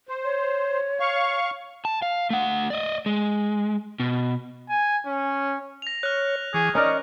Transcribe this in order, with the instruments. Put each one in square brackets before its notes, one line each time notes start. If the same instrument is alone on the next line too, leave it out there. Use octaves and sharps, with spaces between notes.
[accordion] C5
[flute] C#5
[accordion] F5 C#6
[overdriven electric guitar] A5
F5
A3 F#5
D5 D#5
G#3
B2
[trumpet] G#5
C#4
[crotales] A#6 F7
[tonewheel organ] C#5 [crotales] F6 F#6
[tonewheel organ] E3 C#6 D6 [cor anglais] G#4
[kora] C#4 A#4 D5 [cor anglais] D#4 [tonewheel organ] D#5 C#6